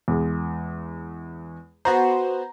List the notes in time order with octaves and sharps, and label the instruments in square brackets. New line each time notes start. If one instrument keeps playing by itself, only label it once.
[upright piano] E2 G#3
[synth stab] B3 F#4 C5 [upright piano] A#5